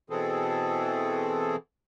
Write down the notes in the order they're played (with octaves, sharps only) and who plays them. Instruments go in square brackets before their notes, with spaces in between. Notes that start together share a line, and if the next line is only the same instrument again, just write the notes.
[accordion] B2 E3 C4 G#4 A4